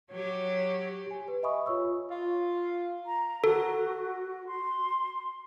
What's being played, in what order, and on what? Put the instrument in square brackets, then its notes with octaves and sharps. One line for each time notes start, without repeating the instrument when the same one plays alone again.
[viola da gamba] F#3 G4 [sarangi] C#5
[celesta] G4 G#5
B4
D#5 E5 G#5 B5 C#6 D#6
F4 C#5 C#6 E6
[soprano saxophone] F4
[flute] A#5
[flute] F#4 [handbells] A4
[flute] C6